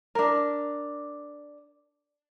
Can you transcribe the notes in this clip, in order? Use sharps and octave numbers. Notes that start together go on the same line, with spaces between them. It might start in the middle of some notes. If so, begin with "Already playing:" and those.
D4 A#4